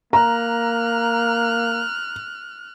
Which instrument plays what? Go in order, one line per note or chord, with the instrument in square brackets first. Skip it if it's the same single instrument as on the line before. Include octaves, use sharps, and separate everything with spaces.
[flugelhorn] A#3 [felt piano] A#5 [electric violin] F6 F#6